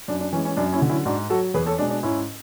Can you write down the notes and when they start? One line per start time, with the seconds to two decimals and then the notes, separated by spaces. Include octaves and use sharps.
0.08 F#2 D4
0.20 D4
0.33 E3 C#4
0.36 G#3
0.45 C#4
0.57 F#2 D4
0.73 C#4 E4
0.82 D3 F#3
0.89 C#4 E4
1.05 G#2 D4 F#4
1.30 F#3 F#4 A4
1.54 E2 G#4 B4
1.66 A4 C#5
1.78 B2 G#3 D4
1.90 D4
2.03 G#2 C#4 E4